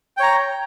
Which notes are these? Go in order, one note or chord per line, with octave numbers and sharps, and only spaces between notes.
C#5 G5 A#5